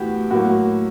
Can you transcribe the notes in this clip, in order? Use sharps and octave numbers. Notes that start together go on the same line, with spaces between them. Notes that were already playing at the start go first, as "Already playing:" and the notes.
Already playing: A2 E3 F#4 G4
A2 F#3 A#3 F#4